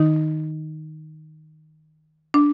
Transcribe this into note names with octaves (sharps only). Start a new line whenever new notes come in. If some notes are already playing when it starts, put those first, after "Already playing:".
Already playing: D#3 D#4
D4